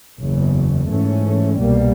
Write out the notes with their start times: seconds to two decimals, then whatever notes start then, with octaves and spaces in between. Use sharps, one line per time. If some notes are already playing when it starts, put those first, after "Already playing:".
0.20 F#1 E2 C#3
0.90 G#2 E3 A3 C#4
1.60 C2 B2 G3 A#3